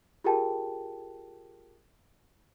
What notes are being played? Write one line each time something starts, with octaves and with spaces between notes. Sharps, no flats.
F4 G4 G#4 A#4 G5 A5